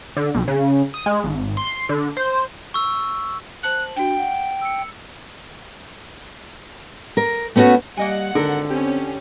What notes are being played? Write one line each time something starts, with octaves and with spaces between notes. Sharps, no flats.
D3
B1
C#3
D#6
G#3
G#1
C6
D3
C5
C#6 E6
C5 A5 F#6 F#7
D4 F#4 G5
F#5
E6 C#7
A#4
A3 B3 C#4 D#4 F#4
G3 A#3 D#5 F#5 G#5
G#1 D3 A4 A#4
C4 C#4 G4